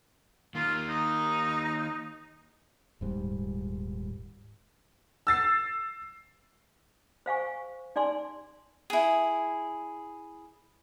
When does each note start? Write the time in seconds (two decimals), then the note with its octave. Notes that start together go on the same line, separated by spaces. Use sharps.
0.55 D#3 A#3 F4
0.89 D#4
3.01 D#1 G#2 G3
5.27 E6 A6 C7
7.26 C5 F5 G#5 C#6
7.96 D#4 D5 G#5 C6
8.90 E4 G#4